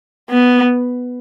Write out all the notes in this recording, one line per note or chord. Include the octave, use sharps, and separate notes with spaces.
B3